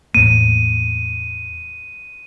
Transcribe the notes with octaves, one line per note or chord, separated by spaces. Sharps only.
E2 A2 A#3 D#7